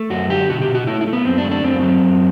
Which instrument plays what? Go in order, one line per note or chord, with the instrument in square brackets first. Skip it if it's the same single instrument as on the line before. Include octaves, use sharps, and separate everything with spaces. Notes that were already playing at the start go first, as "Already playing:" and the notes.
Already playing: [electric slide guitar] A3
F#2 F#4
D3 G4
B2 F#4
G4
B2
F#4
A3 E4
E4
A3
B3
F#2 C4
D4
A3
D4
F#2 C4
F#3
F#2